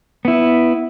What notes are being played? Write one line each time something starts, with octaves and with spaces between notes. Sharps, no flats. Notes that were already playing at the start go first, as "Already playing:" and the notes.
B3 E4